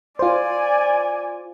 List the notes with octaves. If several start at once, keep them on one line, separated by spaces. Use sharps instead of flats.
F4 C5 D5 G#5